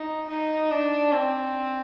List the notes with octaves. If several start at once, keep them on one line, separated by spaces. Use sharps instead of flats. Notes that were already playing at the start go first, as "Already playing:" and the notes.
Already playing: D#4
D#4
D4
C4